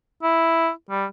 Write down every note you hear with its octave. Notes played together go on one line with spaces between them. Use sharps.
E4
G3